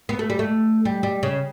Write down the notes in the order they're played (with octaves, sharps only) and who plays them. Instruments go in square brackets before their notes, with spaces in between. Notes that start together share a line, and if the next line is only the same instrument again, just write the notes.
[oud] B3
A3
G3
A3
G3
G3
C#3